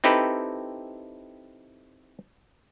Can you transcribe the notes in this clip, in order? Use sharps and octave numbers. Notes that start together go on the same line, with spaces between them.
C4 D#4 E4 G4 A4 B4